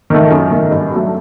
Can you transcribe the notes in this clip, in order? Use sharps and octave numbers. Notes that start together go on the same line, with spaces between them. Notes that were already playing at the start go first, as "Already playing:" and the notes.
D#3 A3
F#2
D#3 A3
G2
F#3 A3